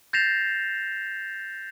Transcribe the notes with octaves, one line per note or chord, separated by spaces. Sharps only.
G6 A6 A#6 C7 E7 F7